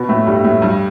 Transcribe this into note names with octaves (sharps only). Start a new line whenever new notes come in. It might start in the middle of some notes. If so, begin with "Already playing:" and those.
Already playing: B2 B3
A2 A3
G2 G3
A2 A3
G2 G3